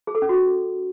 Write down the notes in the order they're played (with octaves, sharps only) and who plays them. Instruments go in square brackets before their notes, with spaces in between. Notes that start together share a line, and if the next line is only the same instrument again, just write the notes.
[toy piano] G#4
A4
C#4
F#4